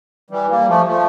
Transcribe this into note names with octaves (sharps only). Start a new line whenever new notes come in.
E3 G3
G3 A#3
F3 A3
F3 A3